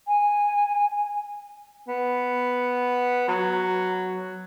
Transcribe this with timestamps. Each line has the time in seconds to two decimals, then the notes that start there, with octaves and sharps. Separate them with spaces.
0.08 G#5
1.88 B3
3.28 F#3